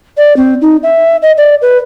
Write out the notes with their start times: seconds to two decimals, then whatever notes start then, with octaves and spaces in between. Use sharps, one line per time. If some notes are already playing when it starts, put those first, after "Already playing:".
0.18 D5
0.37 C4
0.62 D#4
0.83 E5
1.22 D#5
1.38 D5
1.62 B4